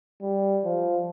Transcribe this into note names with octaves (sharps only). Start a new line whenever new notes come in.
G3
F3